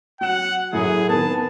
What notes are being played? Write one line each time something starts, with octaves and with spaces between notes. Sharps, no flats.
F#3 F#5 E7
F#2 A2 G#4
D#3 B3 A5